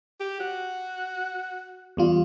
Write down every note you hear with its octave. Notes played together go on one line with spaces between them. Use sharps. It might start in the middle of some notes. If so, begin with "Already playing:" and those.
G4
F#4
E2 G3 F4